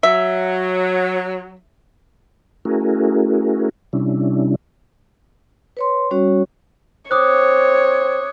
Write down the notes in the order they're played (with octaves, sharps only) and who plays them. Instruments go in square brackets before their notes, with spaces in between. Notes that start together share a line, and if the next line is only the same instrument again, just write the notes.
[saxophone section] F#3 [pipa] E5
[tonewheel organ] A3 C#4 E4 F#4 G#4 A#4
C3 G3 C#4 D4 E4
[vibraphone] B4 C#5 C6
G3 C#4 F#4 C#5
[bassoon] C4 [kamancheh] C#5 [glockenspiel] D6 D#6 F#6